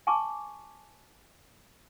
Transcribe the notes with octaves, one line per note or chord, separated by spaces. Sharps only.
G#5 A5 C#6 D6